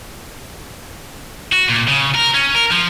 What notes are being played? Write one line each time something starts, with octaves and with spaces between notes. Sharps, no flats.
F#4
A#2
C#3
A#4
C#4
A#4
F3